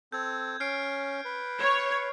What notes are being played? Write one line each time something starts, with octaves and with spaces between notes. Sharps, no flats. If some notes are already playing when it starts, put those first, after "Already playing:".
C4 A4 G6 G#6
C#4 F6 C7 D7
B4
C#5